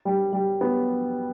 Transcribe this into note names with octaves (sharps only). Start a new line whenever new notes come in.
G3
G3
B3